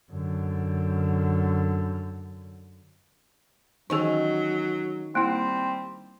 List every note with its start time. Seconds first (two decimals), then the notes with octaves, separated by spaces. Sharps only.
0.11 F#2 D3
3.90 D#3 E3 F#3 C#4 G#4
5.15 G3 A#3 C4 E4